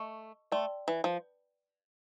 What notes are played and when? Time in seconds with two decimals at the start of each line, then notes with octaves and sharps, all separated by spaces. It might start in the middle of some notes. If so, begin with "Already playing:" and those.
Already playing: A3 D#5 C#6
0.52 A3 D5 G5 C6
0.88 E3
1.04 F3